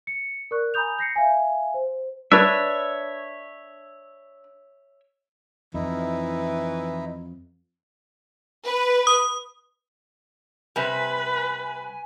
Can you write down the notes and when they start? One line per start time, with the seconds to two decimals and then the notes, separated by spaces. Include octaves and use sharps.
0.07 C#7
0.51 A#4 D5 C#6 F#6
0.74 G#5 A#5 B5 D#6 G6 F7
0.99 G6 A#6 C7 C#7
1.16 E5 F5 G#5
1.74 C5
2.32 D4 B4 C#5 E5
5.74 F2 E3 D#4 E4
8.67 B4
9.07 D#6
10.76 C3 G3 B4 G#5